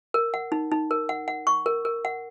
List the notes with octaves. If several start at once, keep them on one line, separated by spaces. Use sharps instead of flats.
A#4
F#5
D#4
D#4
A#4
F#5
F#5
C#6
A#4
A#4
F#5